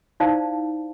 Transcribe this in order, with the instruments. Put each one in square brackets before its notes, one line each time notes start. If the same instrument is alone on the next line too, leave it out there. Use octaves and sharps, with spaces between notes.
[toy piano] D#4 E4 C5 D5 F5 A5